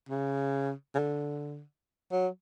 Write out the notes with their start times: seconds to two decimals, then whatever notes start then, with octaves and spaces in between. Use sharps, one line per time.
0.09 C#3
0.94 C#3
0.99 D3
2.12 F#3